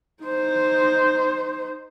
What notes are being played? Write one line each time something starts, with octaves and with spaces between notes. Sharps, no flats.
D#4 C5